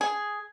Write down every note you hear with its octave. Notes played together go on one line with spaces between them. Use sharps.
G#4